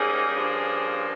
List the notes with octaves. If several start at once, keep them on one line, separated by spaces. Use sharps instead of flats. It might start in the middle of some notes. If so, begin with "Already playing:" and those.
Already playing: G#2 G3 A#3 C#4 G#4
G2 F3 A#3 C#4
G#4